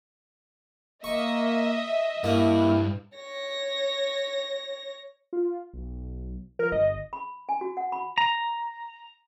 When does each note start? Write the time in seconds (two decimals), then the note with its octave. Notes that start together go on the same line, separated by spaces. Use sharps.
1.04 A#3 D#5 E5 C#6
2.24 G2 A#3 E4
3.16 C#5 A#6
5.33 F4
5.74 B1
6.59 F3 A#4
6.72 G1 D#5
7.13 B5
7.49 G#5
7.61 F#4
7.77 F#5
7.92 B5
8.18 A#5